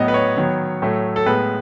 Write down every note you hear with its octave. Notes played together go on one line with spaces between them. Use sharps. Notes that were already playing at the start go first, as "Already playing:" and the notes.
Already playing: A2 F#3 B3 D#5
B4
C#5
D#3 F#3 B3
A2 F#3 A3
A4
A2 G#3 B3 B4